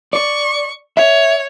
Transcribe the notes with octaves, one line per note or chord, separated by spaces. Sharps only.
D5 C#6
C#5 E5